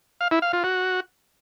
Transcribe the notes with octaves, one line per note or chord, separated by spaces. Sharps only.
F5
E4
F5
F4
F#4